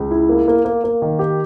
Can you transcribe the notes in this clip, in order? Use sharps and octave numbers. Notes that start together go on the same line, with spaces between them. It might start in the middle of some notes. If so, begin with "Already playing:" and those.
Already playing: C#2
E4
A#3
A#3
A#3
A#3
D#3
G4